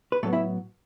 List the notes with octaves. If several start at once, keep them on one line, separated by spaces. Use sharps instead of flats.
B4
A2 F#3 A3 B3 A4
E4 E5